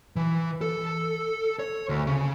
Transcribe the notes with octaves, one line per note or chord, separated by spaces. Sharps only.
E3
A4
C#5
D2
C#3